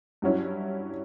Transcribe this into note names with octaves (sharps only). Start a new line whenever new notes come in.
G2 F#3 C#4 E4